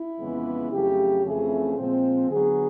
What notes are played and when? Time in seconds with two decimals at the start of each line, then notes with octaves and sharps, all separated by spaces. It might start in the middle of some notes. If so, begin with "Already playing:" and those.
Already playing: E4
0.19 F2 C#3 E3 G#3 B3
0.71 F2 C#3 F#3 A3 G4
1.25 F2 C#3 E3 A3 C4 G#4
1.78 A#2 F3 G#3 C4
2.30 D3 F#3 B3 G#4